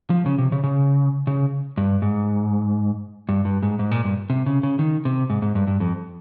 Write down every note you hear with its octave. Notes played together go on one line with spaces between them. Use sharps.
F3
C#3
C3
C#3
C#3
C#3
G2
G#2
G2
G2
G#2
G#2
A#2
G2
C3
C#3
C#3
D#3
C3
G#2
G#2
G2
G2
F2